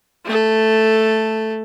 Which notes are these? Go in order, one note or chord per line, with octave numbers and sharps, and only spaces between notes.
A3 A4